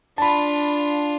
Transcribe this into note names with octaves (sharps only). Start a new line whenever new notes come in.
D4 F4 A5 B5